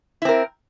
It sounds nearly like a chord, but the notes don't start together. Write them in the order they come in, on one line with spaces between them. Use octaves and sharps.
E4 C4 A#4